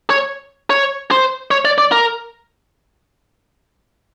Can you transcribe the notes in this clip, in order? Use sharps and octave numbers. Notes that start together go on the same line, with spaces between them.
C#5
C#5
C5
C#5
D5
D5
A#4